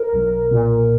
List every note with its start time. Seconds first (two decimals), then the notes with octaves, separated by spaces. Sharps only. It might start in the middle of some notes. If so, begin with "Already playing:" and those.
Already playing: A#4
0.13 B1
0.51 A#2